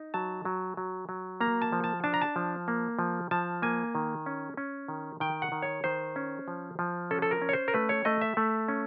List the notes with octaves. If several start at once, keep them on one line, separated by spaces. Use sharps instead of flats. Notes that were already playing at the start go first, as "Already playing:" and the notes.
Already playing: D#4
F#3 A5
F#3
F#3
F#3
A#3 A#5
A5
F3
A5
D4 A5
A#5
A5
F3
A#3
F3
F3 A5
A#3 G#5
D#3
C#4
C#4
D#3
D#3 G5
F#5
D#3
C#5
D#3 C5
C#4
F3
F3
C#4 A4
A4
A#4
C#4
C#5
C5
A#4
A3 B4
C#5
A3 D#5
E5
A3
C#4